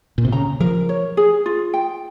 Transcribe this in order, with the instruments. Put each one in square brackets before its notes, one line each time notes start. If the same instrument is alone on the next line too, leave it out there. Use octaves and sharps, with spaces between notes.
[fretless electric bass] A#2
C3
[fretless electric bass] C#3 [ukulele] A#5
[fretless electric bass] F3 [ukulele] A#4
[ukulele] C#5
G#4
F4
G5